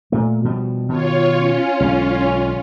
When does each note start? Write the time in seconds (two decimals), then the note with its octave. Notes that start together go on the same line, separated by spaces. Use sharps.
0.12 A#2 A3
0.44 B2 F3 G3
0.89 B2 D#3 F4 C#5
1.37 C#4 F4
1.80 B1 D3 G#3